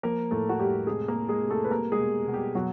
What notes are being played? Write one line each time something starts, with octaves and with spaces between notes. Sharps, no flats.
F3 A#3 A#4
A2 A3 A4
F#4
G3 A3 G4
C3 G#3 G#4
A#3 A#4
G#3
G#3 G#4
C3
A3 A4
B4
G3 A#3 A#4
G#3 G#4
B2
B2
G3 G4
B2 F#3 F#4